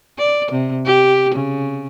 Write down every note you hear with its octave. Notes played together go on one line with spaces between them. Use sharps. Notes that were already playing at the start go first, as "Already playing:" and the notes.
D5
C3
G4
C#3